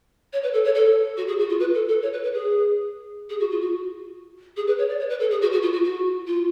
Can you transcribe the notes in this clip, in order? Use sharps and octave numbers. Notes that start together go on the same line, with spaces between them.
C#5
B4
A4
C#5
A4
F#4
G#4
F#4
F4
B4
A4
A4
C#5
B4
B4
G#4
G#4
F#4
F4
F#4
G#4
B4
C#5
D5
C#5
B4
A4
G#4
F#4
F#4
F4
F#4
F#4
F4